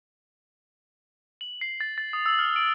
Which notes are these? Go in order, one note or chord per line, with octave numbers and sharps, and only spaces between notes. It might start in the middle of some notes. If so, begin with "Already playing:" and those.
F#7
C7
A6
A6
D#6
E6
F6
D7